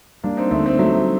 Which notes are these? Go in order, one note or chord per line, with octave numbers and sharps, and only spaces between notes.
G3 A#3 D4
C4 D#4
D2 A3 C4
A3 C4
F#3 G3 A3